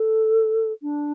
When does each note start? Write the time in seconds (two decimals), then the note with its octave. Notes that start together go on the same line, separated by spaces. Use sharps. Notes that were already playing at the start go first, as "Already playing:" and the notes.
Already playing: A4
0.82 D4